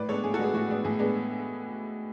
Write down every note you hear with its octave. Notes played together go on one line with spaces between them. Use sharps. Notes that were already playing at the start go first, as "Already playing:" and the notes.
Already playing: A2 B4 D5
G#3 B3 D4 A4 C#5
A2 G#4
F#4 A4
G#3 B3 D4 G#4
A2 F#4
G#3 B3 D4
A2 G#4
G#3 B3 D4